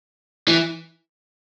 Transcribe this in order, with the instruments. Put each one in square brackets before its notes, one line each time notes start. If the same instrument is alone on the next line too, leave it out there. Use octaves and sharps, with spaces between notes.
[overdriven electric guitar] E3